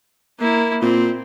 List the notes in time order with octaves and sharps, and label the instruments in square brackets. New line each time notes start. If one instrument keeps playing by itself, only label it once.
[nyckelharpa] A#3 E4
[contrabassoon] A#2 [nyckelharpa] C4